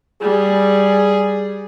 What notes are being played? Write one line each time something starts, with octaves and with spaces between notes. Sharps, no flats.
G3 G#4